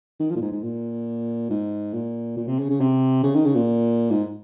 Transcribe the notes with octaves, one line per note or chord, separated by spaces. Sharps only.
D#3
F3
A#2
G#2
G#2
A#2
G#2
A#2
A#2
C3
C#3
C#3
C3
C#3
D#3
C#3
A#2
G#2